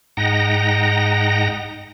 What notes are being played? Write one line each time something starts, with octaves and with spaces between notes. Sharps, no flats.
G#2 D#5 F#5 G5 A#5 A#6